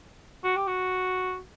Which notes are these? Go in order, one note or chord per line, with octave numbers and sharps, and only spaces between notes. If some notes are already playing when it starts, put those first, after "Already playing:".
F#4
G4
F#4